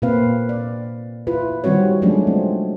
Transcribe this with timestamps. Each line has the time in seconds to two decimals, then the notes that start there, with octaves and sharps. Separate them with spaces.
0.02 A#2 A#3 C4 B4 F5
0.49 D5
1.27 E4 F4 B4
1.64 D#3 G3 C4 F#4 C#5
2.02 F3 F#3 G#3 A3 C#4 D4
2.27 C4